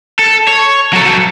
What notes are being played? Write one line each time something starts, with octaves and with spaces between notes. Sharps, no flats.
A4
C#5
F#3 A4